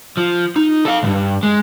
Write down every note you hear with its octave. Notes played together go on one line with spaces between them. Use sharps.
F3
D#4
A4 F5
C2 G2
G#3